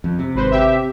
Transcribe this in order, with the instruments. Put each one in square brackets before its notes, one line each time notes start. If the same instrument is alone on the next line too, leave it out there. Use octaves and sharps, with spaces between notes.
[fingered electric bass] F2
C3
[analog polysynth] G#1 B4 C5
G4 E5